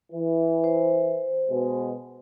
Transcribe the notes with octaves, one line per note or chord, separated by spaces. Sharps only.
E3
C5
B2 G#3